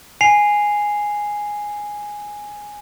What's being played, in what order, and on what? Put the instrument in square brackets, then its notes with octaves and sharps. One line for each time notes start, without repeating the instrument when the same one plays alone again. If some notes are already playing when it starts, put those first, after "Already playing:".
[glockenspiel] G#5 C7 F7